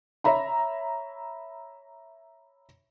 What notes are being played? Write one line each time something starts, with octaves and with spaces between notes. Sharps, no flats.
C#5 E5 A#5 B5